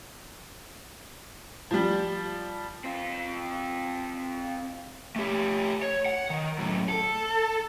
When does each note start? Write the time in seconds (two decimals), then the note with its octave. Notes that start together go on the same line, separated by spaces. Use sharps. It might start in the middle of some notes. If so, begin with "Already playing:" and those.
1.71 F3 G3
2.84 C4 F4
5.16 A3 G4
5.82 C#5
6.06 F#5
6.30 D#3
6.58 F#2 A2
6.89 A4